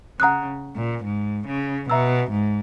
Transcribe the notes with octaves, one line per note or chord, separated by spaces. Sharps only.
C#3 F#5 A#5 D#6 F#6
A#2
G#2
C#3
B2 E5 A#5 E6
G#2